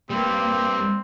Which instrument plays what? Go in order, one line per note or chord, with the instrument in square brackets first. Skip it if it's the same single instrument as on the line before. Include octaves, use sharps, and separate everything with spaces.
[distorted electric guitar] G3 B4 [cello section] A#3 [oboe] C4 [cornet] G4